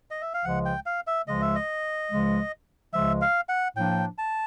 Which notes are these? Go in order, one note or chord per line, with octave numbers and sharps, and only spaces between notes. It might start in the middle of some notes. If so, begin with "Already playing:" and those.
D#5
E5
F5
C#2 C#3 F3 G#3 F#5
G5
F5
E5
C#2 C#3 F3 G#3 D#5
E5
D#5
C#2 C#3 F3 G#3
C#2 C#3 F3 G#3 E5
F5
F#5
A2 F3 A#3 D4 G5
A5